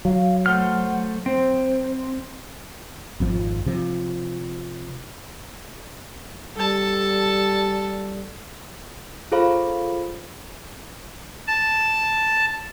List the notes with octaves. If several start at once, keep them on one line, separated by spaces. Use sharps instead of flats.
F#3 F5
A3 C5 F#5 F6
C4 C5
G#1 F2 F3
C3 F3
G3 A4 A5
F4 G#4 A4 C5 F5 B5
A5